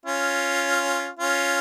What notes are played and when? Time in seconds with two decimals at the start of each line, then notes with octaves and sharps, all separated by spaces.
0.05 C#4 F4
1.19 C#4 F4